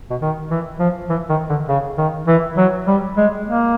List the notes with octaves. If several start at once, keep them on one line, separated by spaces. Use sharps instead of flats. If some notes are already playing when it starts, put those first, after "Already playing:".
B2
D#3
E3
F3
E3
D#3
D3
C#3
D#3
E3
F#3
G3
G#3
A#3